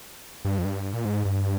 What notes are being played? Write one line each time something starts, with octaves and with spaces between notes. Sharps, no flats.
G2
F2
G2
A#2
G#2
G2